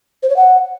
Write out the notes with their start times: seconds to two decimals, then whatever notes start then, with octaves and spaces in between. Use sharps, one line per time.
0.23 C5
0.30 C#5
0.36 F#5